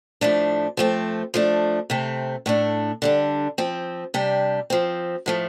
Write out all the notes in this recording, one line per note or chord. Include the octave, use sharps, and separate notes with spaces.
A2 F3 A3 D4
F3 A3 C4
F3 A3 D4
C3 A3 C4
A2 A3 D4
D3 G3 D4
F3 C4
C3 G3 D4
F3 C4
A2 F3 A3